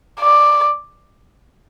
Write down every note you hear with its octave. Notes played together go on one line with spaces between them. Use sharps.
D5